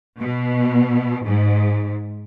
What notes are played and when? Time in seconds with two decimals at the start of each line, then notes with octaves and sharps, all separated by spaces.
0.20 B2
1.25 G#2